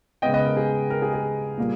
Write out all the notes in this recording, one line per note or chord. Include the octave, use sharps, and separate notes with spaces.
C#3 G#3 B3 D#5 G5
B4 D#5
A#4
G#4
A#4
G#4
G#4
A#2 G3 A#3